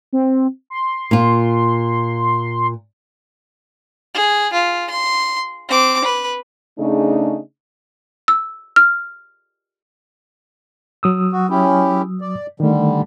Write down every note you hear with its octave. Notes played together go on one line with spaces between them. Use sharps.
C4
C6
A#2 F4
G#4
F4
C6
C4 D6
B4
C#3 A3 D4 D#4 G#4
E6
F6
F#3 D#6 E6
F#4
C#4 E4 G4
D5
D3 D#3 G3 A3